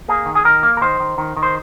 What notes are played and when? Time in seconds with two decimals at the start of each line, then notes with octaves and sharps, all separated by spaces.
0.08 A#3 G#4
0.26 D#3
0.35 G#4
0.45 D#3 A#4
0.63 A#3
0.77 A#4
0.81 D#3 C5
1.00 D#3
1.18 D#3
1.37 D#3
1.43 C5